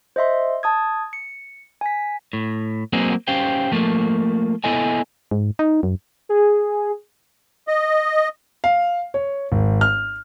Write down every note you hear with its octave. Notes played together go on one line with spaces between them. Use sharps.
C5 D#5 E5 C6
A5 D#6 G#6
C#7
G#5 B6
A2
F#3 A#3 C4 D#4 F#4 G#4
C#4 G4 C5 F5 G5
F3 A3 A#3
B3 E4 A4 D#5 G#5
G#2
D#4
F#2
G#4
D#5
F5
C#5
G#1
F6